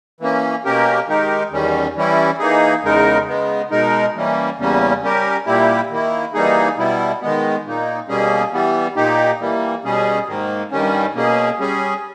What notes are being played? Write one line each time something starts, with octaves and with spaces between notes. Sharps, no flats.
E3 A#3 C#4
B2 A#3 C#4 G4 A#4
D#3 G#3 D#4 G4 A#4
E2 D#3 G3 C#4
E3 G3 C#4 E4
E3 A#3 D#4 G#4
E2 C#3 G#3 D#4 A#4
C#3 G#3 B3
B2 G#3 D#4 A#4
E3 G3 A#3 C#4
E2 C#3 G3 A#3 C#4
G3 C#4 G4 A#4
A#2 G3 A#3 E4 G4
D#3 A#3 E4
E3 G3 A#3 D#4 G#4
B2 G3 B3 E4
D#3 G#3 B3
A#2 A#3 D#4
B2 G3 A#3 C#4 G#4
E3 G3 B3
A#2 A#3 D#4 G4
E3 G3 A#3
B2 G3 C#4 G#4
G#2 D#3 A#3
G2 D#3 G3 C#4
B2 A#3 C#4 G#4
G3 C#4 G#4